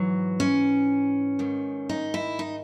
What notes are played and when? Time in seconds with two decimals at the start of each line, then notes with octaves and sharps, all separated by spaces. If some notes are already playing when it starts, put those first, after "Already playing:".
Already playing: G#2 E3 F#3
0.40 C#4
1.39 G#2 D#3
1.89 D#4
2.14 E4
2.39 D#4